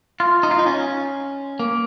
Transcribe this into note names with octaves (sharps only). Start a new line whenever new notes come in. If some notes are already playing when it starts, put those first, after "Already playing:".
F4
D#4
F4
D#4
C#4
A#3